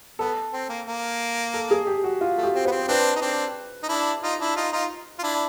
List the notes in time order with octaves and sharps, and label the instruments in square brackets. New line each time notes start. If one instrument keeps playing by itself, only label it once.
[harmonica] B3 [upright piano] A4
[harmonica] C4
A#3
A#3
[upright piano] A4
G#4
G4
F#4
F4
[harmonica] A3
[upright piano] G4
[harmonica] C4
[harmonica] B3 [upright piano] C5
[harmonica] C4
[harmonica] C4 D4 [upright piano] B4
[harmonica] D#4
C4 D4
D#4
D4 E4
D#4 F4
D4 E4
D#4 F4
D#4 F4
F4
D4 E4